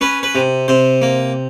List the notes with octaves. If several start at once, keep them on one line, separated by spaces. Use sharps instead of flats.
C#4 B4
B4
C3
C3 C5
A#3